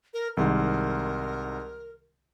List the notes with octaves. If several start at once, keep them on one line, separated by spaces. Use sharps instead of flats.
A#4
C2 G#2 D#3 A#4